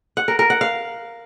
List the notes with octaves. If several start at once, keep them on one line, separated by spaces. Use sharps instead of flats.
F#5
A#4
A#4
F#5
F5